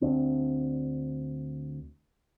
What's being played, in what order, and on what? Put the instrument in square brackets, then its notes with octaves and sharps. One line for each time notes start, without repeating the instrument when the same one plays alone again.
[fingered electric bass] D2 C4 D4